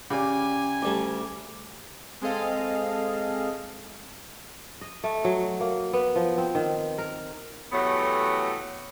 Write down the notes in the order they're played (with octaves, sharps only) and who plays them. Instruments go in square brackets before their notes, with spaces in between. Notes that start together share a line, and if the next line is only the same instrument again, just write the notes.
[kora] C#3 [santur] G4 D5 [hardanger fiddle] G#5
[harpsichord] D2 G3 [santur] D5 A5
[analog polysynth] G#3 C4 G#4 A4 D#5 F5
[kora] D#5
A3
F#3
A#3
B3
F3
C4
D#3
A#4
[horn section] A2 E3 F#3 A3 B3 G4